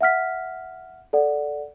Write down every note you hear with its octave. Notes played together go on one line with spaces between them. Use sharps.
E5 F#5 F6 B6
A4 D5 F#5